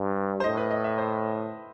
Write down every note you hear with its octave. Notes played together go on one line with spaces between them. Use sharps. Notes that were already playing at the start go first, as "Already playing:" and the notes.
Already playing: G2
C5
A2 D#5
B4
D#5
E5
C5